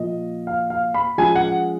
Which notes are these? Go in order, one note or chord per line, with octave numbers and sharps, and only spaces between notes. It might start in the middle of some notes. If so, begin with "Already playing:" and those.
Already playing: A#2 F3 A#3 F4 D#5
F5
F5
B5
F3 G#3 C#4 F4 G#5
F#5